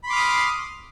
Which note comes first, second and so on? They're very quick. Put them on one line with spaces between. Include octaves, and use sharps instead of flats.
B5 C6 D6 F6 D#6